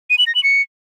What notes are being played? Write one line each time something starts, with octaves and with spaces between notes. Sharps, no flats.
D#7
F#7
A#6
F#7
C#7